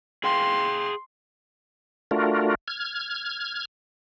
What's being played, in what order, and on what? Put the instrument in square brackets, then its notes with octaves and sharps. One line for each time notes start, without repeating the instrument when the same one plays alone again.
[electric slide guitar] G#4 F5 G5 [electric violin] C6
[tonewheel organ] A3 D4 F4 F#4 A#4
F6 G#6